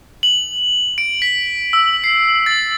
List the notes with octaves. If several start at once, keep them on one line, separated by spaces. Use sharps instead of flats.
F#7
D7
B6
E6
C7
A6